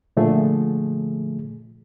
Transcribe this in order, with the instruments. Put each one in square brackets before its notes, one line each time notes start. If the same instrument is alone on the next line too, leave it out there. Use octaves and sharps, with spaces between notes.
[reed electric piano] A#2 D3 F3 A3 G#4